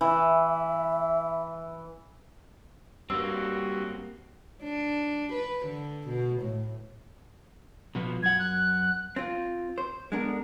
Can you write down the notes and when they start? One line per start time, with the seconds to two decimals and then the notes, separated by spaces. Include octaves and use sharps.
0.01 E3 E5
3.10 G2 A#3 C4 F#4 E6
4.63 D4
5.33 B4
5.65 D3
6.08 B2
6.41 A2
7.95 B2 F3 B3
8.23 F#2 F#5 G#6
8.39 F#6
9.16 C4 F4
9.78 C5
10.12 D3 G#3 B3 D4 A#4